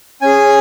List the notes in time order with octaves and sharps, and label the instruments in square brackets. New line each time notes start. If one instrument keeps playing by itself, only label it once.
[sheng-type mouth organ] C#4 G#4 G#5